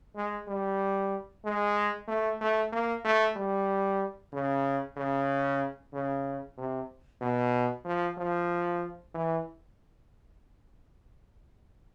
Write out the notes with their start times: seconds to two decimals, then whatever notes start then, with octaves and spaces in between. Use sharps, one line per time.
0.16 G#3
0.48 G3
1.45 G#3
2.08 A3
2.41 A3
2.73 A#3
3.05 A3
3.36 G3
4.33 C#3
4.96 C#3
5.93 C#3
6.58 C3
7.21 B2
7.85 F3
8.18 F3
9.14 E3